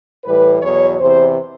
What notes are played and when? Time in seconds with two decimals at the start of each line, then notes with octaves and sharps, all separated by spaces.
0.25 A2 E3 G3 B4
0.62 E2 B2 F#3 C#5
0.99 E2 C3 E3 C5